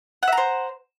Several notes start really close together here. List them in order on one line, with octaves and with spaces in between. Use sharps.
F#5 E5 A#5 C5